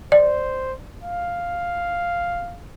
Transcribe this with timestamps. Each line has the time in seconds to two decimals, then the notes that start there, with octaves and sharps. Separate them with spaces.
0.12 C5 D5
1.03 F5